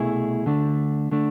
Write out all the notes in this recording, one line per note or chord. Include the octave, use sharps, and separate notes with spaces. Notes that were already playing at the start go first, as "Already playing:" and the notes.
Already playing: C2 B2 A3 E4 G#4
D2 D3 A3 D4
D3 A3 D4